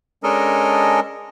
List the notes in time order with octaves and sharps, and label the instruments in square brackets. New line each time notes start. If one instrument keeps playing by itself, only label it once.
[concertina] G#3 C#4 D4 A4 A#4 D#5